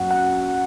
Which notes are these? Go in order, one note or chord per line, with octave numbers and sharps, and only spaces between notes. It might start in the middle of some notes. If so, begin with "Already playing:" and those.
Already playing: F#2 F#3 C#4 F#4 F#5
F#5